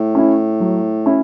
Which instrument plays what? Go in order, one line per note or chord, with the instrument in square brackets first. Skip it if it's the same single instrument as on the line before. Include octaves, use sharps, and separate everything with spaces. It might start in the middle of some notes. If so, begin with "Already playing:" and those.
Already playing: [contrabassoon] A2
[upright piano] C#4 E4
F#3
C#4 E4